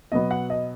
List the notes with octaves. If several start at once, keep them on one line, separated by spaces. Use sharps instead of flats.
B2 F#3 B3 D#5
F#5
D#5